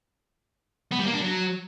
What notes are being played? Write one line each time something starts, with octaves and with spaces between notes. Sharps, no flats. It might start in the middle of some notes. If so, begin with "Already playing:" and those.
B3
G3
A#3
D4
F#3